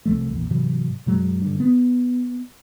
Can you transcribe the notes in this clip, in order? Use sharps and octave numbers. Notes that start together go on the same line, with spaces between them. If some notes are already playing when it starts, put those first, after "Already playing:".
C2 F3 A3
A#1 E2 A#2
G#2 C3 E3 F#3
F#2 B2 F#3 G#3
G2 D3
B3